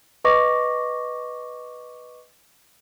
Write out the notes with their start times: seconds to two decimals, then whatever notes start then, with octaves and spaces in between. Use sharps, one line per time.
0.25 B4 D#5 C#6 D6 A#6